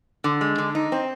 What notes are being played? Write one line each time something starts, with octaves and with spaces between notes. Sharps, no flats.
D3
G#3
D3
D#4
C4